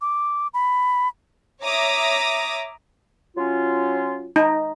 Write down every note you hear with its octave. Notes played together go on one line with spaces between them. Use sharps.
D6
B5
C#5 E5 A#5 D6 D#6
F#3 C#4 F4
D#4